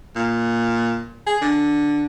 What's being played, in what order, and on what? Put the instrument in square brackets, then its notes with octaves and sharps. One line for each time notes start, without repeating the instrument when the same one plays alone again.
[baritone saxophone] A#2
G#4
D3